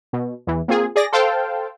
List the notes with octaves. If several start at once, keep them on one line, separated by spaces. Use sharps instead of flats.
B2
E2 E3
A#3 C4 F4 G#4
G#4 D5 A#6
A4 C5 F5 G5 A5